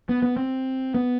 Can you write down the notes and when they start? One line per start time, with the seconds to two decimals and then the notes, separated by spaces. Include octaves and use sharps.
0.09 B3
0.22 B3
0.37 C4
0.94 B3